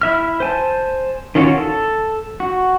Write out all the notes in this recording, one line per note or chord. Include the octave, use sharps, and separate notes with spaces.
E4 E5 F6
C5 G#5 A5
D#3 C#4 F4 F#4 C#5
A4
F#4